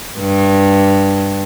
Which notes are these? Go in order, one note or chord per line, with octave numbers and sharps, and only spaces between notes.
G2